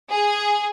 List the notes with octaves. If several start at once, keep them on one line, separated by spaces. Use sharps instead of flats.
G#4